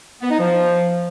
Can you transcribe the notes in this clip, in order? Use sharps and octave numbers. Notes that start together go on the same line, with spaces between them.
B3
D#4
F3